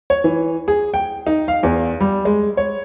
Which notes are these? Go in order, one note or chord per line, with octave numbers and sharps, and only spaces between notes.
C#5
E3
G#4
G5
D#4
F5
E2
G3
G#3
C#5